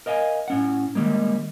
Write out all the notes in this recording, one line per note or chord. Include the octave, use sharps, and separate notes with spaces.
A#4 D#5 F5 G#5
A2 C#4 F#5
D#3 G3 G#3 A#3